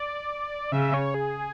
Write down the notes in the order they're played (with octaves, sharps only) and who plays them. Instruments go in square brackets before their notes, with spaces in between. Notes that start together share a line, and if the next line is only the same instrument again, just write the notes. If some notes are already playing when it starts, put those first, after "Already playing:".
Already playing: [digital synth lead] D5
[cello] C#3 [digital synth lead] E5
[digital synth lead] C#5
G#4